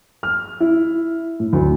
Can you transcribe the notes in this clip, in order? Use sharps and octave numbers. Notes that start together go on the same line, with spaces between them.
F6
E4
A2
D2